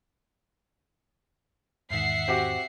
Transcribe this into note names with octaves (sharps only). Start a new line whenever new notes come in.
E2 G#2 D#3 E5 F#5 C7
C4 F#4 G4